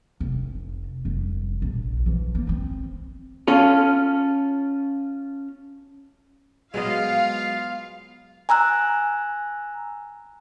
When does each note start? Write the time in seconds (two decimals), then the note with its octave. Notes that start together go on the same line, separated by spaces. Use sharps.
0.20 F1
1.05 F1 G3
1.62 A#1
2.06 E3 F3
2.35 A#3
2.47 D#3 C4
3.48 C#4 F4 A4
6.74 G#2 F#3 G#3 B3 F4 D#5 F5
8.49 G#5 A#5 E6 F#6